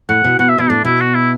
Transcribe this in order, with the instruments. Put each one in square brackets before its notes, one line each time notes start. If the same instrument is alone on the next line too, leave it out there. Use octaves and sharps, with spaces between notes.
[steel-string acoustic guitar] A2 [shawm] F#5
[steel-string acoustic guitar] B2
[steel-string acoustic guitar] B2 [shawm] F#5
[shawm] E5
[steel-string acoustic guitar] B2 [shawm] E4
[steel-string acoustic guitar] A2 [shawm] D4
[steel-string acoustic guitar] B2 [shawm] E4
[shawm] F#4
E4